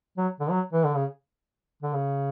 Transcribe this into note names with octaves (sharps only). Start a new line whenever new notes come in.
F#3
D3
F#3
E3
D3
C#3
D3
C#3